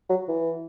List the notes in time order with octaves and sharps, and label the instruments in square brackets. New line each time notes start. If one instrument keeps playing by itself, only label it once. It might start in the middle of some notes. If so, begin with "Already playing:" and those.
[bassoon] F#3
E3